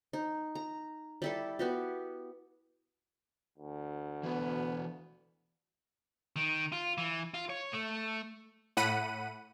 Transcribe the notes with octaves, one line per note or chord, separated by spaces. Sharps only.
D#4
A#5
G3 E4 A4
B3 F#4 G4
D2
E3 B3 F#4
D#3
F4
E3
F4
C#5
A3
A2 F#5 B5 D#7